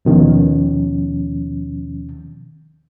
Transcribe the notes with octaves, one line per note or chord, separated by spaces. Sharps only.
D#2 B2 D#3 F3 C#4